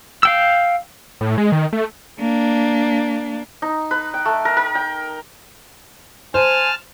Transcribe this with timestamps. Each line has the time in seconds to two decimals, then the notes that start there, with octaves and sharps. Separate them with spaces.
0.23 F5 G5 E6
1.21 A2
1.38 G#3
1.52 D#3
1.73 A3
2.20 A#3 D4
3.62 D#4
3.91 B4
4.14 G5
4.25 A3
4.45 A#4
4.57 A#4
4.75 G5
6.34 C5 G#5 A5 F6